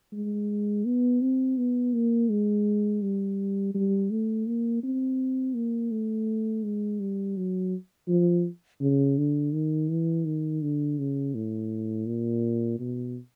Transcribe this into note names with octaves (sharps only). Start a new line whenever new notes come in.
G#3
B3
C4
B3
A#3
G#3
G3
G3
A3
A#3
C4
A#3
A3
G#3
G3
F#3
F3
C#3
D3
D#3
E3
D#3
D3
C#3
A2
A#2
B2